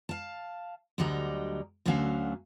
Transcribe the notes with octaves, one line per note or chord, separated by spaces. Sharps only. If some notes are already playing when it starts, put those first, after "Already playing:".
F5 A5
D2 D3 F#3 G3 D#5 A#5
D2 D3 F#3 A3 C#4 F5